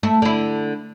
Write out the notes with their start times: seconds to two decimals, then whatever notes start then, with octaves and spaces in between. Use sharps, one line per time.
0.03 A3 E4
0.22 D3 E4